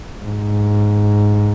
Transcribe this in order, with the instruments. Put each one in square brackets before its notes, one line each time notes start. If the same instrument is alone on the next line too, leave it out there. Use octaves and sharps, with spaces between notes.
[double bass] G#2